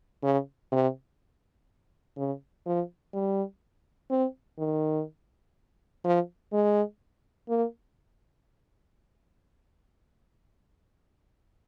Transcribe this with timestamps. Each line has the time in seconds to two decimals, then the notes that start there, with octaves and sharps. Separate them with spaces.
0.23 C#3
0.72 C3
2.17 C#3
2.66 F3
3.13 G3
4.10 C4
4.58 D#3
6.04 F3
6.53 G#3
7.49 A#3